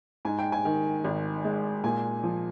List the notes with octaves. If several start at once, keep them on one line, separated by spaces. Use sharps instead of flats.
G#2 G#5
G5
G#5
D#3
G#1
G#3
A#2 G#5
F3